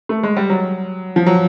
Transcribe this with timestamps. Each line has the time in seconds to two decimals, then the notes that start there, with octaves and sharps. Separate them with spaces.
0.09 A3
0.23 G#3
0.36 G3
0.50 F#3
1.16 F3
1.26 F#3